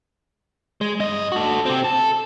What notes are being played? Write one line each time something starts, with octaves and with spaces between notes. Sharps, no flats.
G#3
G2 D#5
F#4 A4
C4 G4
A4